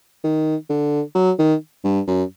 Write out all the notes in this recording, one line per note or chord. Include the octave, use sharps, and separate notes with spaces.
D#3
D3
F#3
D#3
G2
F#2